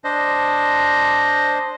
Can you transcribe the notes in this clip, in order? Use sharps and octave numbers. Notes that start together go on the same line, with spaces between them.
D4 C5 D#5